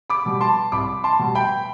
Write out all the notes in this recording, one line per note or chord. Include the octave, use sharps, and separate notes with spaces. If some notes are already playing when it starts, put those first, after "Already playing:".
B5 D6
B2 G3
A5 C6
C2 B5 D6
A5 C6
B2 G3
G5 B5